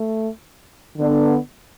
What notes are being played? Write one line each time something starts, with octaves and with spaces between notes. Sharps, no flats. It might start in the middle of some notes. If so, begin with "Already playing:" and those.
Already playing: A3
D3 B3 D4